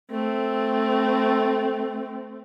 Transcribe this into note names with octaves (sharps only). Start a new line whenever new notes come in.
A3 C4